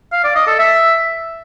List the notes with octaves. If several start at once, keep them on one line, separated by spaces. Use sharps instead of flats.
F5
D5
D#5
A4
E5